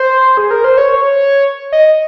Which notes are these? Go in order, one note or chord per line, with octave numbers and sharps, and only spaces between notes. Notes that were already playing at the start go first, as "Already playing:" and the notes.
Already playing: C5
G#4
A#4
C5
C#5
D#5